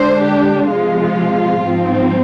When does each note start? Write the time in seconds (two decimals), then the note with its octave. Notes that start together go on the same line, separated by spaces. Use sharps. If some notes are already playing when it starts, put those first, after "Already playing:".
Already playing: D3 G#3 D4 C5
0.23 G4
0.69 C3 F3 G#3 F4
1.63 G#2 F3 C4 D#4